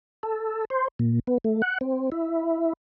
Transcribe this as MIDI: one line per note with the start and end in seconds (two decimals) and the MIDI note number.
0.23 0.65 69
0.70 0.88 72
0.99 1.19 46
1.27 1.38 59
1.44 1.62 57
1.62 1.78 78
1.81 2.10 60
2.12 2.73 64